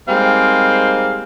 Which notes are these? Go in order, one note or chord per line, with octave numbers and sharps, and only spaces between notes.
G3 G#3 A#3 C4 D#4 F5